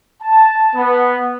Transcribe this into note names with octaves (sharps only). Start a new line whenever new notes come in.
A5
B3